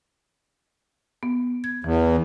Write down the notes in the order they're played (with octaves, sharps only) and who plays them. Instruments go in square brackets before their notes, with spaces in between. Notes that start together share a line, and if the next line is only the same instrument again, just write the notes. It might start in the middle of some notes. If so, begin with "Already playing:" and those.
[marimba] B3
G#6
[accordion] E2 [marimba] E3